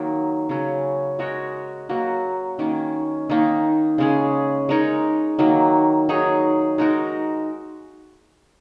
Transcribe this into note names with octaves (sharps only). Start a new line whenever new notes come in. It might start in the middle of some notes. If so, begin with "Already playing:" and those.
Already playing: D#3 F#3 A#3
C#3 F#3 C#4
G#3 F#4 A#4 C#5
F#3 A#3 F#4
D#3 A#3 C#4
D#3 A#3 D#4
C#3 G#3 C#4 G#4
G#3 D#4 A#4 C#5
D#3 F#3 A#3
F#3 D#4 G#4 C#5
G#3 D#4 F#4 A#4